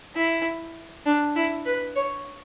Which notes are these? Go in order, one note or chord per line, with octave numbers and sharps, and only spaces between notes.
E4
D4
E4
B4
C#5